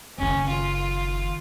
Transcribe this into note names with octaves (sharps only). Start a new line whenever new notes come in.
F#1 D#3 C#4
F4